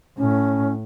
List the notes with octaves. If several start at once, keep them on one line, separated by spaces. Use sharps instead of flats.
A2 C#4